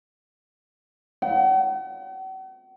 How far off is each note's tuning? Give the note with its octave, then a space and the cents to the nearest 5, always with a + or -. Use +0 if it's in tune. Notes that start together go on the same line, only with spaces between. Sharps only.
F#5 +45